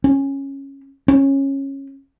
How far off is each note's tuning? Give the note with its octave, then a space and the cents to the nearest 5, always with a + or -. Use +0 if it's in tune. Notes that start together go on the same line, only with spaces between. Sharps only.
C#4 -10
C#4 -15